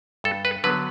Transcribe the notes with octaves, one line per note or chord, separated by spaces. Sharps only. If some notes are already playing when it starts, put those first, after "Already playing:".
G2 A4
B4
D3 F#3 B3 B4